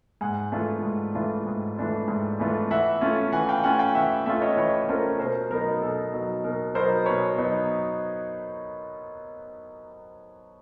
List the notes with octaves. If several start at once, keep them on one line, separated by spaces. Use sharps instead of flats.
G#2 F#5 G#5
E3 A3 D4 F4
G#2
E3 A3 D4 F4
G#2
E3 A3 D4 F4
G#2
E3 A3 D4 F4
E3 E5 F#5
A3 C#4 F4
E3 F#5 G#5
F5 G5
A3 C#4 F4 F#5 G#5
F5 G5
E3 E5 F#5
A3 C#4 F4 D5 E5
C#5 D#5
E3 B4 C#5
A3 C#4 F4 A#4 C5
B2 A#4 C5
F#3 B3 D#4 A#4
B2 A4
F#3 B3 D#4
B2 A#4
F#3 B3 D#4 A#4 C5
B2 B4 C#5
F#3 B3 D#4